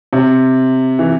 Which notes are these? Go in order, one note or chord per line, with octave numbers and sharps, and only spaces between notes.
C3
E3